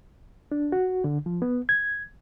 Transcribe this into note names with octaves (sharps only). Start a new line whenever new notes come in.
D4
F#4
D3
F3
B3
G#6